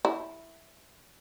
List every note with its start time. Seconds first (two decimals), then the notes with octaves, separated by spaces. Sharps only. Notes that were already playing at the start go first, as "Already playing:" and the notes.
0.05 E4